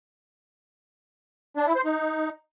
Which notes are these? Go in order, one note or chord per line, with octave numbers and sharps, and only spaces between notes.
D4
E4
C5
D#4